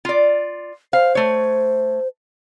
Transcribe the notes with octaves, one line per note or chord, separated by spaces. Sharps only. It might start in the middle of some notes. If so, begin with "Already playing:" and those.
F4 D5
C5 F5
A3 C#5